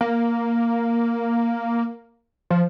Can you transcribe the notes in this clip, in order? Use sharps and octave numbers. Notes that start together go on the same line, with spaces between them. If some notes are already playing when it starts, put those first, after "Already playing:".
A#3
F3